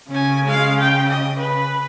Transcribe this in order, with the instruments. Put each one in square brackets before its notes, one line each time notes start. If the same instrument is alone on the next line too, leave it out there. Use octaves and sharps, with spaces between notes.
[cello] C#3 [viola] C#4 G#5
[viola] G#3 F5
G5
D#5
B4